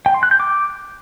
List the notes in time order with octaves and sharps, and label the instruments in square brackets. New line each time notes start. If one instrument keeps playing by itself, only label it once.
[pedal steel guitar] G5
C6
F#6
G6
D6